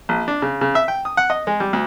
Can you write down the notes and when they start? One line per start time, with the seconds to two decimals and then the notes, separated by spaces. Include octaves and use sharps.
0.09 A#1
0.28 D4
0.42 C#3
0.61 C#3
0.75 E5
0.88 G5
1.05 D#6
1.17 F#5
1.30 D#5
1.47 G#3
1.60 G3
1.73 D2